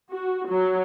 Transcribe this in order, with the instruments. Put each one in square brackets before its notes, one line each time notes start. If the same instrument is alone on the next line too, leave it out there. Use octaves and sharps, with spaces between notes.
[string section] F#4
F#3